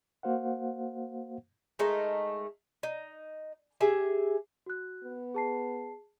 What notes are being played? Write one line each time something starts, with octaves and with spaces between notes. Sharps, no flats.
A#3 F#4 C5 F5 F#5
G#3 A3 D#4 A#4
D#4
G4 G#4 E5
F#4 F#6
B3
G#4 A5 C7